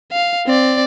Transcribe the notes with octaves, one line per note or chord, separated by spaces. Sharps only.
F5
C4 D5